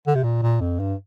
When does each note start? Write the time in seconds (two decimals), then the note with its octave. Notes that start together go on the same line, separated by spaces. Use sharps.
0.07 D3
0.15 C3
0.24 A#2
0.43 A#2
0.61 F2
0.79 G2